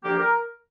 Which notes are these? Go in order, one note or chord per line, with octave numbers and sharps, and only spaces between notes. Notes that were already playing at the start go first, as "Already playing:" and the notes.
D3 F3 A#3 G4
A#4